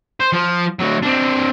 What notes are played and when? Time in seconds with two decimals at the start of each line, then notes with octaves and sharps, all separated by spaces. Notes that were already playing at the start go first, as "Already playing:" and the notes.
0.20 C5
0.33 F3
0.79 D2 F#3
1.02 C4 D4